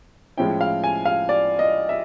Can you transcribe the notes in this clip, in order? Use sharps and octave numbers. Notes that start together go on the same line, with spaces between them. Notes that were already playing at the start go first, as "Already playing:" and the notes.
A2 F3 G#3 C#4 E4 G5
F5
G#5
F5
D5
D#5
E5